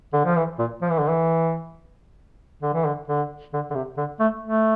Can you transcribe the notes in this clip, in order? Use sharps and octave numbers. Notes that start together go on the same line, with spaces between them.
D3
F3
E3
A#2
F3
E3
D3
E3
D3
E3
D3
D3
D3
D3
C3
D3
A3
A3